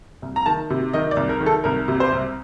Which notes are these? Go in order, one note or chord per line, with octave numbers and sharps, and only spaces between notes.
C2
A#5
D#3 A5
C3
D#3 D#5
D5
C2
A#4
D#3
A4
C2 A#4
C3
C5
C2